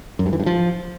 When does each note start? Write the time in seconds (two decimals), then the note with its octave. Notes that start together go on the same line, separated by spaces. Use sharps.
0.19 F#2
0.26 G2
0.33 E3
0.40 G2
0.46 F3